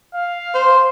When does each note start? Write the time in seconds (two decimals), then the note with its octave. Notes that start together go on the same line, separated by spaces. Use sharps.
0.14 F5
0.55 C5